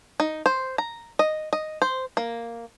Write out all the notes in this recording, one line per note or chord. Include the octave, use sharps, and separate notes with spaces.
D#4
C5
A#5
D#5
D#5
C5
A#3